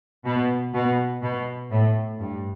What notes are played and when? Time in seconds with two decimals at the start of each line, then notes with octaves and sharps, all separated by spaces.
0.24 B2
0.74 B2
1.21 B2
1.70 A2
2.18 G2